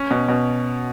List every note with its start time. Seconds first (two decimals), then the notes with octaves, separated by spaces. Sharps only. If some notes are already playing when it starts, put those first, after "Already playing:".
Already playing: C#4
0.11 B2
0.29 B2